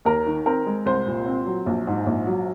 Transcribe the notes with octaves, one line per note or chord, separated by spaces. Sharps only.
D#2 A#4
D#3
C4 A#4
G#3
C2 C5
A#2
C4
F#3
A#1
G#2
A#1
F#3